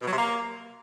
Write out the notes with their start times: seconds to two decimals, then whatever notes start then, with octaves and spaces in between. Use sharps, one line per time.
0.02 B2
0.07 F#3
0.12 C3
0.18 A#3